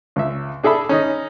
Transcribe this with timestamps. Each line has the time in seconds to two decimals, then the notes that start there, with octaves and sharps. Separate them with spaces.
0.16 C#2 E5
0.63 D4 G#4 A4 E5 B5
0.89 C#4 D#4 D#5